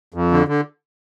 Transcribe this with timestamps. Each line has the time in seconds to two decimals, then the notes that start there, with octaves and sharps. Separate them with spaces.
0.14 F2
0.32 D3
0.48 D3